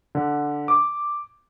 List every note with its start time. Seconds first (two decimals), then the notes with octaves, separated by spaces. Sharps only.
0.15 D3
0.68 D6